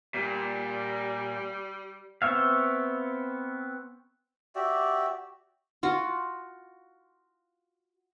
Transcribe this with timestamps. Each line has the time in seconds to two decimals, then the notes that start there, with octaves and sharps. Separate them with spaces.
0.14 A#2 G3
2.22 B3 C4 C#5 E5 F5
4.55 F#4 G4 D5 E5
5.83 F4 F#4